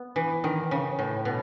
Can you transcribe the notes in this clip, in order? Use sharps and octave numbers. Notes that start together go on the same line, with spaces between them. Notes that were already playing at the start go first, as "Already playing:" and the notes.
Already playing: B3
E3
D#3
C#3
A2
B2